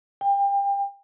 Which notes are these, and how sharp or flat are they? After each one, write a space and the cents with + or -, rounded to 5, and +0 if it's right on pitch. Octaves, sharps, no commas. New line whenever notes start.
G5 +30